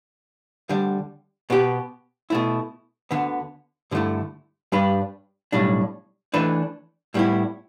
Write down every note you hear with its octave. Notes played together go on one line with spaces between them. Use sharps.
D2 D3 G3
B2 B3 G4
B2 A3 E4
D2 D3 B3
G2 D3 A3 E4
G2 G3 D4 G4 B4
B1 A2 G3 D4
E3 A3 D4 B4
A2 G3 B3 E4